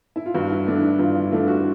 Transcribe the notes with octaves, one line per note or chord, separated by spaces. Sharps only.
E4
F4
G2 F#4
E4
E3 A3 D4 E4
E4
G2 F4
E4
E3 A3 D4 F4
F#4